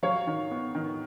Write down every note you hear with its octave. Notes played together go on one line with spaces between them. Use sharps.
F#3 C#5 F5
D#3
B3
D#3